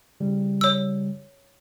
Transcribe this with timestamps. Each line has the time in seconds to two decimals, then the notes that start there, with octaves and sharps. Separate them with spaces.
0.20 C#3 G3
0.61 C#5 E6